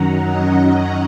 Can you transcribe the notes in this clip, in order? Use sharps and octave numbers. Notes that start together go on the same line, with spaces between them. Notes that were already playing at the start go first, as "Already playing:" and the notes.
Already playing: F#2 D#3 F#3 C#4 F#5 A#5
D#5